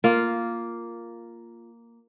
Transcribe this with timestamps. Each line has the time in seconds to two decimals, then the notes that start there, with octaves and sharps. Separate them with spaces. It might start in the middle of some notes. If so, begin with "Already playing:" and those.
0.04 A#3 F4